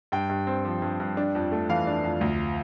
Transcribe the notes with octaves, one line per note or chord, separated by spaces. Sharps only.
G2 G5
G2
C4
F3
G2
G2
D4
F2
A3
E3 F5
D4
F2
D2